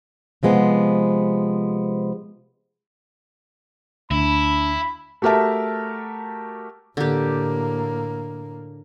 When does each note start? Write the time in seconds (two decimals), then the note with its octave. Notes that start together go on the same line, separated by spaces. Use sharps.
0.43 C3 F3 G#3 B3
4.11 D2 D4 E4 B5
5.22 A3 F#4 G4 A#4 E5 A5
6.97 A2 D3 A#3 G4